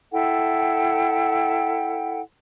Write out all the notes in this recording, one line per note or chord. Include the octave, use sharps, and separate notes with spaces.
E4 A4 F#5 G5